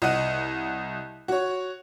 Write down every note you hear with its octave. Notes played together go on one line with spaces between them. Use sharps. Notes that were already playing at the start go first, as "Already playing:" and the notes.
C2 D#5 F#5 F#6 D#7
F#4 C#5